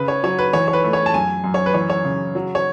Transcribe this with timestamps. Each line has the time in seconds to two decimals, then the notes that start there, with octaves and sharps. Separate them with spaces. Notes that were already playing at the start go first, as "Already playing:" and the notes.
Already playing: C#3 B4
0.08 C#5
0.23 F#3 C#5
0.39 B4
0.53 E3 C#5
0.68 C#5
0.73 B4
0.84 A3
0.93 C#5
1.06 A5
1.14 F#2 G#5
1.44 F#2
1.54 C#5
1.66 B4
1.74 E3 C#5
1.90 C#5
2.05 C#3
2.35 F#3
2.55 C#5